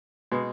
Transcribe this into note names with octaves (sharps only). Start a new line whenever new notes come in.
B2 G#3